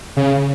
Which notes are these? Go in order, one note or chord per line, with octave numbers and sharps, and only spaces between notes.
C#3